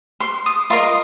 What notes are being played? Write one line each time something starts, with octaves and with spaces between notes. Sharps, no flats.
C6
D#6
F4 A#4 D#5 C6